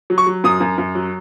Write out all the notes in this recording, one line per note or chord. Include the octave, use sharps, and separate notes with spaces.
F#3
C#6
F#3
F#2 D#6
F#2
F#2
F#3